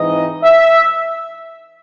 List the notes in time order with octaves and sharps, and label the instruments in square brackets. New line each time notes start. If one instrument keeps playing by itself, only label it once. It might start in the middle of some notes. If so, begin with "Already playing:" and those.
Already playing: [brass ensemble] G#2 E3 C4 D#4 D#5
E5